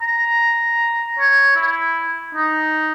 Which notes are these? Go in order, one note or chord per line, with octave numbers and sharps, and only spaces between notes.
A#5
C#5
E4
D#4